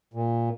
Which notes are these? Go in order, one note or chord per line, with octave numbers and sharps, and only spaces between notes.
A#2